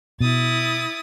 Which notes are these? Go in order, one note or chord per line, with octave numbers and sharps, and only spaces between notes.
B2 E4 D#6 A6